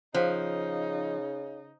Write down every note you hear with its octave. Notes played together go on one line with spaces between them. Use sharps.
C#3 F3 D#4 C5 F5